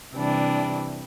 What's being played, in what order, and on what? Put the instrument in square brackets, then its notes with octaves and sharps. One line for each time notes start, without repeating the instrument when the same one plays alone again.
[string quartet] C3 E3 G3 D4